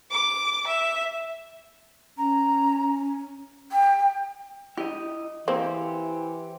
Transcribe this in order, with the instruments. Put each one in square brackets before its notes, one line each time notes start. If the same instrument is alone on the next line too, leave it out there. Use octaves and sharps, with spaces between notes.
[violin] D6
E5
[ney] C#4 [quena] A#5
[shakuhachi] G5
[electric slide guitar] E4 D#5 [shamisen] G4
[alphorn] E3 [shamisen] A#3 C4 [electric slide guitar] G4 C5